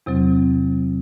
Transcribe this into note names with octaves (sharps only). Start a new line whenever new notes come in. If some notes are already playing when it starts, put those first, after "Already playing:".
E2 C3 F#3 C4